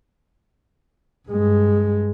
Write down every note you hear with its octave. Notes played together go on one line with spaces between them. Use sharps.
G2 G#3